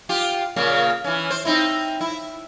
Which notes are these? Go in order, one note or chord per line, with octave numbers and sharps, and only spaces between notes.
F4 G4
A#2 C#3 A#3
E3 C#4
C5
C4 D#4 E4
E4